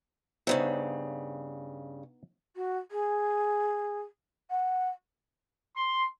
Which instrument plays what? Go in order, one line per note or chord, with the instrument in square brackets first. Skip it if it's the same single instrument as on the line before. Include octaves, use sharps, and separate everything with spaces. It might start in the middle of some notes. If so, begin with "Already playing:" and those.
[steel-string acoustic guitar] G2 A#2 C#3 [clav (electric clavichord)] B3 D#4 E5 [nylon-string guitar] C5 C#5
[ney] F#4
G#4
F#5
[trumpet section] C6